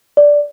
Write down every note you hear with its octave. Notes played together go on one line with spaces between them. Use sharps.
D5